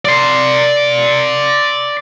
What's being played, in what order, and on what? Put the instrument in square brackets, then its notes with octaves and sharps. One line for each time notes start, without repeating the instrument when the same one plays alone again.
[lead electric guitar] D5 C6